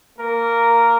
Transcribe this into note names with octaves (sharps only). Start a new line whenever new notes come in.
A#3 A#4